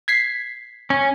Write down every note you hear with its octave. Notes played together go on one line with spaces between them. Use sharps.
G#6 B6 C7
C#4